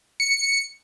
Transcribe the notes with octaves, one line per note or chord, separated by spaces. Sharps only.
C#7